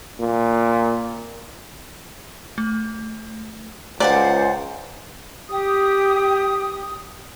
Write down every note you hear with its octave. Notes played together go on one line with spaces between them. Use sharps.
A#2
A3
C#2 C5 D5 F5 F#5 G#5 A#5
G4 D#6